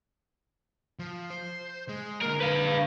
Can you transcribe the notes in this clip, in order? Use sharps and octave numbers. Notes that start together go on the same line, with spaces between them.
F3
C5
G#3
D3 A#3 A#4
B4 F5